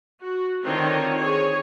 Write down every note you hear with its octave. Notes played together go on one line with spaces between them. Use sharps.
F#4
D3 D#3 C4 F4 C#5
G#4 C#5